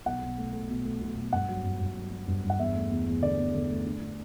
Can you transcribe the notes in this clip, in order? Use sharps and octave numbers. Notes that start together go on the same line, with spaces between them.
B1 F#5
B1
A3
A3
B2
A3
B1
B1
G2 F#5
F#3
G2
G2
F#3
F#3
G2
G2
F#5
E2 E5
A3
E2
E2
D3 D5
E2
D3
A3
D4
D4